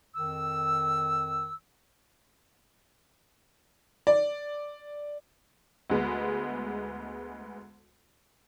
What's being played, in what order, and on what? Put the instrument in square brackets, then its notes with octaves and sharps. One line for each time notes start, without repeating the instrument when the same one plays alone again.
[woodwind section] F2 D#3 E6
[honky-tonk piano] D5
D2 G#3 B3